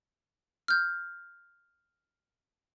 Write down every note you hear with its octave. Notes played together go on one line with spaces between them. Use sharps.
F6 G6